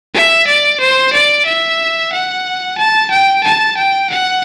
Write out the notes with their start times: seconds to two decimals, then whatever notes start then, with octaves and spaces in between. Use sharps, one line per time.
0.14 E5
0.47 D5
0.80 C5
1.13 D5
1.46 E5
2.12 F#5
2.78 A5
3.11 G5
3.44 A5
3.77 G5
4.10 F#5